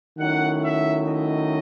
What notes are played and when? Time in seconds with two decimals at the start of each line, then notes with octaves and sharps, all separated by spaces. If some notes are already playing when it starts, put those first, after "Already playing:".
0.18 D#3 F#3 A3 C#4 E4 F#5
0.63 E5
1.07 D#5